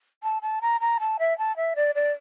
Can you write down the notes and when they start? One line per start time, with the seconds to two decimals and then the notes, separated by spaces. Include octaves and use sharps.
0.23 A5
0.42 A5
0.62 A#5
0.81 A#5
1.00 A5
1.19 E5
1.38 A5
1.56 E5
1.76 D5
1.95 D5